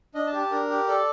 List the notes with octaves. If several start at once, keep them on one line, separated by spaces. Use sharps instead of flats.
D4 D#5
A5
G4
A5
D4 A#4
G4
A4 D5